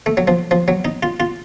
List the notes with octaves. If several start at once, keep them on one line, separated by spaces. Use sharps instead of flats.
A3
F#3
F3
F3
F#3
D#4
F4
F4